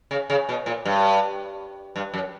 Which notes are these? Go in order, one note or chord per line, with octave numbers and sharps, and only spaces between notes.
C#3
C#3
B2
A#2
G2
G2
F#2